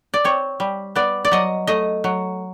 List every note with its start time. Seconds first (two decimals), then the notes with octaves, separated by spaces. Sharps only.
0.14 D5
0.25 C4 C#5
0.60 G3
0.96 B3 D5
1.25 D5
1.32 F#3 D#5
1.67 A3 D#5
2.04 F#3